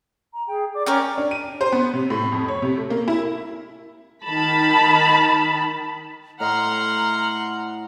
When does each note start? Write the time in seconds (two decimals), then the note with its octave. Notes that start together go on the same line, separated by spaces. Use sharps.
0.33 A#5
0.47 G#4 G5
0.74 D5 D6
0.86 C#4 A#4 D5 G5 C#6 F6
1.18 D4
1.31 D#7
1.61 C5
1.72 B3
1.94 C3
2.10 A2
2.32 F2
2.48 C#5
2.62 C3
2.77 A3
2.90 A#3
3.08 E4
4.26 D#3 A5 B5
6.40 A2 D#5 F#5 A#5 C6 F6